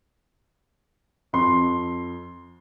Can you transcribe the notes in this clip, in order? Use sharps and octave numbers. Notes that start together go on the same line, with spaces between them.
F2 C6